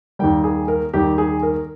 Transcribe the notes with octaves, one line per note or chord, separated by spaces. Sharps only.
D#2 D#3 G3 G5
G#4
A#4
D#2 D#3 G3 G4
G#4
A#4